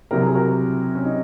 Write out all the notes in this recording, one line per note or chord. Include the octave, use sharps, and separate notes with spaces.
C2 C3 F#3 A#4
G#4
F#4 A#4
C#4
D#4